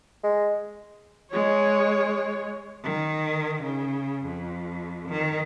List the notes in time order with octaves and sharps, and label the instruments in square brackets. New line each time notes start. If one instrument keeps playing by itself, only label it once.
[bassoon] G#3
[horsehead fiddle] G#3 C#5
[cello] D#3
C#3
F2
D#3